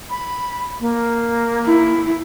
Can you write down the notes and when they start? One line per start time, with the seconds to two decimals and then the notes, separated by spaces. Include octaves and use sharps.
0.10 B5
0.80 A#3
1.66 E4